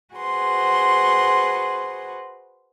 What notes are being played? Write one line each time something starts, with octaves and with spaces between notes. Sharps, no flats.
F#4 G#4 B4 C5 C6